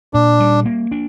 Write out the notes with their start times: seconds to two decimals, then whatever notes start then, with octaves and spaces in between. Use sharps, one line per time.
0.14 A#2 D4
0.40 G3
0.65 A#3
0.92 D4